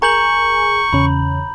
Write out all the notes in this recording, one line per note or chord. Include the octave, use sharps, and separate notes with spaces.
G#4 A#4 G#5 A#5 C#6 G6 F#7
E2 C#3 C#4 B5